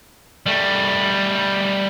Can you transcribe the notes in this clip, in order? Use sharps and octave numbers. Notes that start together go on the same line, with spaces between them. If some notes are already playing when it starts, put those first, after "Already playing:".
G3 A3